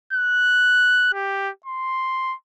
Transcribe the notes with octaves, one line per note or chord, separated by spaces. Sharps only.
F#6
G4
C6